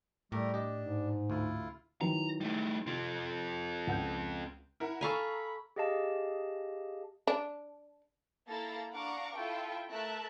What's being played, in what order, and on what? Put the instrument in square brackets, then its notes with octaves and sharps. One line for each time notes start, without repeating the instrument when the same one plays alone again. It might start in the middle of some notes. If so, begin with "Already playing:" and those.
[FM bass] A2 [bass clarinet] G3 [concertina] A3 G4 A#4
[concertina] D4 [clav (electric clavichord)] G4 D#5
[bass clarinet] G#2
[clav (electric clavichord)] D2 [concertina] E4 F4
[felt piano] D#3 E3 F#3 [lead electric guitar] A#5
[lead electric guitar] G3 A3
[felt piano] C3 [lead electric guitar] C4 F4
[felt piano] C#2 F#5 G6
[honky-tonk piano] E4 A#4 F#5
[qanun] A4 F5 G#5 [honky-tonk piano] A#5 C#6 [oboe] B5
[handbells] G4 G#4 D#5 F5 A5
[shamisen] D4
[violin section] A#3 E4 A4 F5 A#5 A6
D4 F5 F#5 A#5 C#6 D6
E4 F4 A4 G5
A3 A#4 E5 A5 F#6